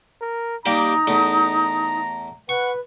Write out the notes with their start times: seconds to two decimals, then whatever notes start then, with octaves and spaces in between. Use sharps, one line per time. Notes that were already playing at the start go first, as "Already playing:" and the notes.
0.21 A#4
0.66 G3 A#3 D#4 G4 A#5
1.07 E2 A3
2.49 B4 F#5 C#6